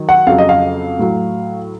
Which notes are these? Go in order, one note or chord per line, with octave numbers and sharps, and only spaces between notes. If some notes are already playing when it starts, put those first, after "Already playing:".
Already playing: D#3 F#3
F#5
F2 C#3 F#3 F5
D#5
F5
A2 F#3